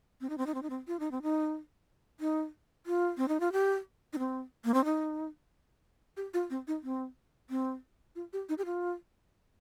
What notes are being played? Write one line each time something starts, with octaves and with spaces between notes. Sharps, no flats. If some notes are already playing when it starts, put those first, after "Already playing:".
C4
D#4
C4
D#4
C4
D#4
C4
F4
D#4
C4
D#4
D#4
F4
C4
D#4
F4
G4
D#4
C4
A#3
C4
D#4
G4
F4
C4
D#4
C4
C4
F4
G4
D#4
G4
F4